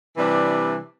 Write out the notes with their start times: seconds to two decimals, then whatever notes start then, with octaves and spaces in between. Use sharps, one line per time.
0.16 C3 E3 G3 D4